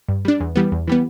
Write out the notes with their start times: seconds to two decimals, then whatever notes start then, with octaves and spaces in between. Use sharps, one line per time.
0.08 G2
0.25 G3 D4
0.40 E2
0.56 E3 G3 B3
0.72 E2
0.87 E3 G3 B3